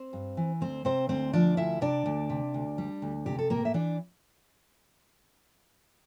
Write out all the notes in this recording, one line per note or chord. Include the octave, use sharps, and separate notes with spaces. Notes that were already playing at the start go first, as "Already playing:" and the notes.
Already playing: C4 C5
G2
E3
D2 C4 C5
C3 C4 C5
D2 C4 C5
F3 D4 D5
D2 E4 E5
C3 D4 D5
D2
C3
D2
G3
D2
C3 G4
A4
A2 A#3 A#4
E5
E3 D4 D5